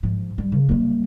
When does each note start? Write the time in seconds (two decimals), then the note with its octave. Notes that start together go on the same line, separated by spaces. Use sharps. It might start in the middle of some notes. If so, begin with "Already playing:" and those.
0.03 G#2 F3
0.38 G3
0.52 C#3
0.69 G3 A#3